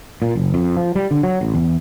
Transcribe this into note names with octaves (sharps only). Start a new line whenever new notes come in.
A#2
F#1
F2
F3
G3
D3
F#3
A1
E2